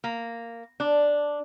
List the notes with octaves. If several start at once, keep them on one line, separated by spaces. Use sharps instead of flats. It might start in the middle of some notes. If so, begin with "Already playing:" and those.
A#3
D4